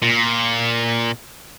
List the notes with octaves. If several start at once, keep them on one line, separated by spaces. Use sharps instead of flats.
A#2